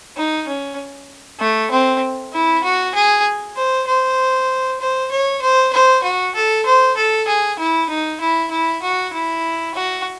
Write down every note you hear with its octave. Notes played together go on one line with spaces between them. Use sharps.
D#4
C#4
A3
C4
E4
F#4
G#4
C5
C5
C5
C#5
C5
C5
F#4
A4
C5
A4
G#4
E4
D#4
E4
E4
F#4
E4
F#4